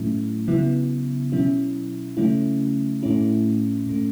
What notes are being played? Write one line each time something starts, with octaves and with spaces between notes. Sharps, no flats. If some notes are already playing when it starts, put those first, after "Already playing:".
Already playing: A2 F#3 A3 C#4 E4
C#3 F#3 B3 E4
B2 F#3 C#4 E4
C#3 F#3 A3 C#4 E4
A2 A3 C#4 E4
A2 A3 C#4